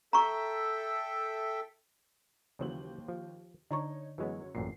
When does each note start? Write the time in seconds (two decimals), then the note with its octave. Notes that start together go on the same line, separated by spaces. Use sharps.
0.13 A4 E5 G5 A#5 C#6
2.59 D#2 C#3 E3 F#3 C5 F#7
3.08 F3
3.71 D3 D4 D#4 C#5 A#5 C#6
4.18 F#2 E3 F#3 G#3 B3 C#5
4.55 A1 F#2 A#2 C7